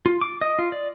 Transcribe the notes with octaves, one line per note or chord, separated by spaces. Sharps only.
F4
D6
D#5
F4
D5